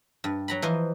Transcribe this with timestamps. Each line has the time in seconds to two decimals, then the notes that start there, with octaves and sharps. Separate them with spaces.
0.24 G2
0.48 F#3 A#5 B5
0.62 E3 F3 C5 D#5